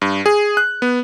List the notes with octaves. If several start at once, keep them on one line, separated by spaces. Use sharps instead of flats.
G2
G#4
F#6
B3